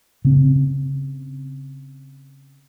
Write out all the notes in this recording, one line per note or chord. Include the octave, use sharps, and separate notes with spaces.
C#3 C4